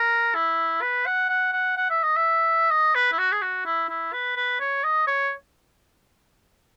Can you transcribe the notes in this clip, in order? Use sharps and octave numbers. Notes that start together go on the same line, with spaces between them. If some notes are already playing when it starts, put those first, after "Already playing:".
Already playing: A#4
E4
B4
F#5
F#5
F#5
F#5
E5
D#5
E5
D#5
B4
E4
F#4
G#4
F#4
E4
E4
B4
B4
C#5
D#5
C#5